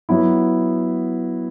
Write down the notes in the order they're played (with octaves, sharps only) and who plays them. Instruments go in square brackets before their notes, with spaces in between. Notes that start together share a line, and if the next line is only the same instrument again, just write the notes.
[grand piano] F#3 B3 E4